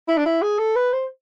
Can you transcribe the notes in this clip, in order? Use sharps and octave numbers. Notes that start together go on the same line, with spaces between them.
E4
D4
E4
G#4
A4
B4
C5